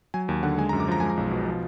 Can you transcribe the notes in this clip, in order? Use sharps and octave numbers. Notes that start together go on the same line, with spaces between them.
F#3 G#5
D#2 G#5
D3 F#5
G#3 G#5
A#5
F#2
D6
F3 A#5
G#3 G#5
A#5
B1
B2
F3